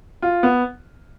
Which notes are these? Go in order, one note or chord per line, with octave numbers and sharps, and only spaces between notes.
F4
B3